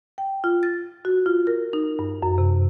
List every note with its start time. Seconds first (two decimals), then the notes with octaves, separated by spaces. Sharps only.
0.18 G5
0.44 F4
0.63 A6
1.05 F#4
1.26 F4
1.47 A#4
1.73 D#4
1.99 G2
2.23 F#2
2.38 C3